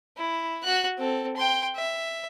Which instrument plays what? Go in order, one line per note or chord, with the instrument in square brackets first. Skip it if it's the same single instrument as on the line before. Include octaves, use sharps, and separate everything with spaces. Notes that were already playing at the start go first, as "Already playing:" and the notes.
[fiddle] E4
F#4 F#6
C4 A4
G5 C6
E5